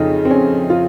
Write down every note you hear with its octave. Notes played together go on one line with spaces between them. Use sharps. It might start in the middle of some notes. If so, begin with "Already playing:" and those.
Already playing: F2 C#3 D#4
C4
C#4
F4